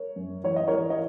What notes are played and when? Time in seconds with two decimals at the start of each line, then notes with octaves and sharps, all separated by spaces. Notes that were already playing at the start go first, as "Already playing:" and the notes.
Already playing: A#4 C#5
0.16 F#2
0.44 E3 C#5
0.56 D#5
0.68 E3 A#4 C#5
0.90 D#5